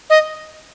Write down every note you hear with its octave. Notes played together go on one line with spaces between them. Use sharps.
D#5